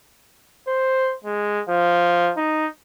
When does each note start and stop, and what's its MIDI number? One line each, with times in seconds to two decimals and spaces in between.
0.68 1.15 72
1.24 1.62 56
1.69 2.32 53
2.37 2.67 63